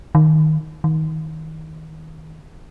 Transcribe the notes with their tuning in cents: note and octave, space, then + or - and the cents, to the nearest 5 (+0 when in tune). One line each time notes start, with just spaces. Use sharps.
D#3 +0
D#3 +25